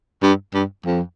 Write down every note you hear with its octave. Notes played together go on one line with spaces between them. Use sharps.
G2
G2
F2